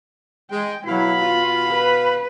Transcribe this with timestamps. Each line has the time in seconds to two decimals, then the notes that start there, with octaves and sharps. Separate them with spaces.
0.51 G#3 G5
0.87 B2 F#3 E4 F5 B5
1.20 F4
1.71 B4